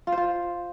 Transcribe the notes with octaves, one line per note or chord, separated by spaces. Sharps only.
F4
C5
F4